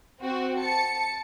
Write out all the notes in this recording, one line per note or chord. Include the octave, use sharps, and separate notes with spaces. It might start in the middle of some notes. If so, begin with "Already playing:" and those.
C4 F#4
A5 C#7